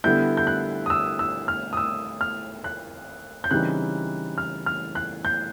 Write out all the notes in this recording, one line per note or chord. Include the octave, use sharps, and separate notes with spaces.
D3 G3 B3 E4 G6
G6
F#6
D#6
E6
E6
F6
D#6
E6
F6
F#6
G6
C#3 E3 G3 C4 D#4 F#6
F6
F6
F#6
G6